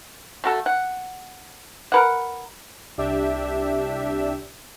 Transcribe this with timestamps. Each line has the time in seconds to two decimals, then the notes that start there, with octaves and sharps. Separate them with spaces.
0.44 A3 F#4 A4
0.66 F#5
1.92 A#4 B4 F#5
2.97 C2 D4 G4 E5